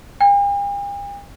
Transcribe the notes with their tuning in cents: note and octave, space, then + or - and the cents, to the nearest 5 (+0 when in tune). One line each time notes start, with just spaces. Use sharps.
G5 +45